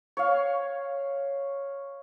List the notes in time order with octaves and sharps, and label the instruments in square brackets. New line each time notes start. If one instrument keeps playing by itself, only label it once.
[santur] C#5 F5